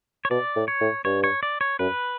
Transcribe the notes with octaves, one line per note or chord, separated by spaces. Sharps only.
C#5
B2 D5
A2
C#5
A2
G2 C#5
C#5
D5
C#5
F#2 B4